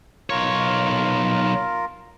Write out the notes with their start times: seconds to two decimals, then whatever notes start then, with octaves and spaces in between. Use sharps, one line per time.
0.30 B1 F4 A#4 C#5